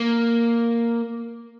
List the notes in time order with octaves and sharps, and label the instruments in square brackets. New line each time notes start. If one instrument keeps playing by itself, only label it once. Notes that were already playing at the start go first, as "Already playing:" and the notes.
Already playing: [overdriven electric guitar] A#3